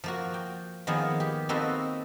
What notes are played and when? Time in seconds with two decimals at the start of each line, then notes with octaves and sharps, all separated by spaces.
0.04 F3 A#3 F#4
0.34 G5
0.87 D#3 F3 A#3 B3 G#4
1.20 G4
1.49 A#3 C4 D#4 F#4 A4 B4